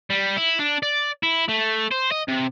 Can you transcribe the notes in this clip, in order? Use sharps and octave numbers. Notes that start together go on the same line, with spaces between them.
G3
E4
D4
D5
E4
A3
C5
D#5
C3